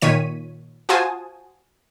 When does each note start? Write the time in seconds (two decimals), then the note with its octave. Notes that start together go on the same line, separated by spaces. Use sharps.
0.02 A#2 D#3 C#5 B6 D#7
0.89 F4 F#4 C5 G#5 A5 D#6